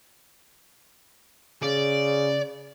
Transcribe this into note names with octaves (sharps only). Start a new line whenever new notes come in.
C#3 D5